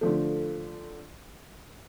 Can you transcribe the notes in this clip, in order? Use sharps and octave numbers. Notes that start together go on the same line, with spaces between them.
D3 F3 A3